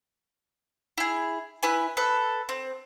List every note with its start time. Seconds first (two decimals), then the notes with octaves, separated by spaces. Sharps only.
0.98 E4 G#4
1.63 E4 B4 G#5
1.97 A4 B4 E6
2.49 C4